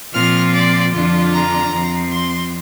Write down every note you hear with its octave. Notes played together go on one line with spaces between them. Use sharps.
A#2 F3 C4 F4 F6
D5
F2 D3 F3 D4 F4
A#5
F2 F3 C4
C6